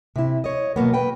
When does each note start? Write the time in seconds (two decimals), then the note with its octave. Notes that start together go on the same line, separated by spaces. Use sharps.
0.16 C3 E4
0.44 C#5 D#5
0.76 B2 F#3 A#3 B3
0.94 B4 G5